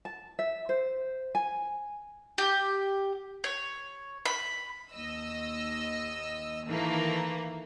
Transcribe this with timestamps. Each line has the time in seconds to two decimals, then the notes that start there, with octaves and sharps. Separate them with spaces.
0.05 A5
0.39 E5
0.69 C5
1.35 G#5
2.38 G4
3.44 C#5
4.26 B5
4.92 D#2 D#5 E6
6.66 D#3 E3 A3 A#3